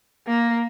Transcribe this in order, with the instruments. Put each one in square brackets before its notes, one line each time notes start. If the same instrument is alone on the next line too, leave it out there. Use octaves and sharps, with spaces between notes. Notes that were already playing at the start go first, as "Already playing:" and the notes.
[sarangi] A#3